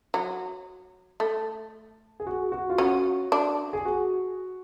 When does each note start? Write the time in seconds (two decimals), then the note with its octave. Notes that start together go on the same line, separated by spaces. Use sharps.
0.14 F#3
1.20 A3
2.20 G#4
2.27 F#4
2.52 F#4
2.70 F4
2.78 C#4 F#4
3.32 D4
3.73 G#4
3.85 F#4